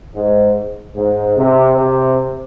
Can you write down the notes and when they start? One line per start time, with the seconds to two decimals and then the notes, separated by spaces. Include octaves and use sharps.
0.14 G#2
0.95 G#2
1.36 C3
1.76 C3